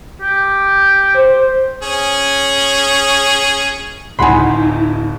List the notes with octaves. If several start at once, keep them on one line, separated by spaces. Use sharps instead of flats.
G4
C5
C#4 G#4
D1 C#2 D#4 E4 G#4 F#5 B5 C6